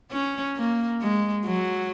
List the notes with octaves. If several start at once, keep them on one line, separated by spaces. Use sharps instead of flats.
C#4
A#3
G#3
F#3